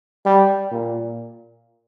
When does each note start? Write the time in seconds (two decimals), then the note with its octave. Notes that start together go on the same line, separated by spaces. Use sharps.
0.26 G3
0.71 A#2